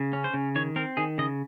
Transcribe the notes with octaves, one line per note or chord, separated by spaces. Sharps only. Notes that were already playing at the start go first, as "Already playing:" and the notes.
Already playing: C#3
C#4
C5
C#3
D#3 C#5
C4 A#4
D#3 G#4
C#3 D#5